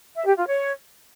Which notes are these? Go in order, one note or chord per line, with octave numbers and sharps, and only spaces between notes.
E5
G4
F4
C#5